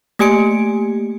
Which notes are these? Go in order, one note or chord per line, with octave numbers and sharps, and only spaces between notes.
A3 A#3 G4 G#5 C#7 D7